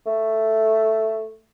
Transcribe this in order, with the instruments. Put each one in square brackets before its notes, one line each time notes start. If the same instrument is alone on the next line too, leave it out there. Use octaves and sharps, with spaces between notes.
[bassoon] A3